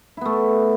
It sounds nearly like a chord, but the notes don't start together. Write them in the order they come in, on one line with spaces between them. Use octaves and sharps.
E4 B3 A3